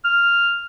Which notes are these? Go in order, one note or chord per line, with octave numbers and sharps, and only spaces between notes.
F6